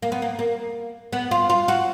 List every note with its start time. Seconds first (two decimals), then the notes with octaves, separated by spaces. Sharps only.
0.02 A#3
0.12 B3
0.22 A#3
0.39 A#3
1.13 B3
1.31 F4
1.50 F4
1.68 F#4